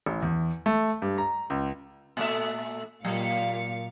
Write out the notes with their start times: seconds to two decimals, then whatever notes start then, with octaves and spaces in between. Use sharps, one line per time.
0.06 A1
0.22 E2
0.66 A3
1.02 G2
1.18 A#5
1.50 C#2
2.17 A#2 A3 E5
3.05 A#2 F#3 F5 C#7